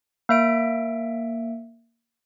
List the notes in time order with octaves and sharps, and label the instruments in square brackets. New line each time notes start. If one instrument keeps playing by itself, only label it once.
[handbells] A#3 E5 D7